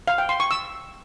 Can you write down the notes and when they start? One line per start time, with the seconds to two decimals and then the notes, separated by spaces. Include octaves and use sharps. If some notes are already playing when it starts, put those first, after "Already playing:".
0.08 F5
0.18 G5
0.29 C6
0.40 C#6
0.51 E6